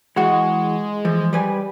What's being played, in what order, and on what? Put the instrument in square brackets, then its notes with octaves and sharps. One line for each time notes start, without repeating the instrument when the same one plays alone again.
[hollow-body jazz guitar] E3 F#4 [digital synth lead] G#3
[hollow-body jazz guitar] E3 F3
G3 B4 G#5